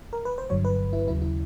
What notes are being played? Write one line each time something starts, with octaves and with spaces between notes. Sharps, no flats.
A#4
B4
C5
G1 G2 D3 F#3 C#5
B4
E4
D#2 C#3 F#3 E4
E4